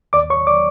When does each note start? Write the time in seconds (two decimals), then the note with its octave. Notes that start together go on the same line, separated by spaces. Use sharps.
0.13 D#2 D5 D6
0.30 C#5 C#6
0.47 D5 D6